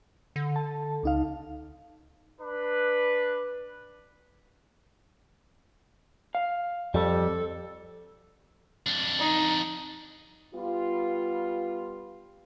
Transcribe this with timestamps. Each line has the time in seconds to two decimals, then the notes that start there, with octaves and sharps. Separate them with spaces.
0.36 D3
0.56 A5
1.03 C#2 D#4 F5
2.41 D4 B4
6.35 F5
6.94 F2 G3 A4
8.87 F2 D4
9.19 D#4
10.55 G3 B3 F4